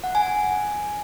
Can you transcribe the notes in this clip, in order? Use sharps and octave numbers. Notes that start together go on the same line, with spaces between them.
F#5
G#5